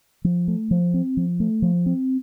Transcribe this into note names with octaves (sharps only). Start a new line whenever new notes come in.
F3
A3
F3
C4
F3
A3
F3
C4